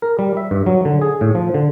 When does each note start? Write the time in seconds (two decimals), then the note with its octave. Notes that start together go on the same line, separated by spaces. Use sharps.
0.02 A#4
0.19 G3
0.37 E5
0.51 G2
0.66 F#3
0.85 D3
1.01 G#4
1.21 A2
1.35 F3
1.54 D3